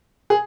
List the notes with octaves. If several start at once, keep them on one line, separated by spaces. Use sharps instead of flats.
G#4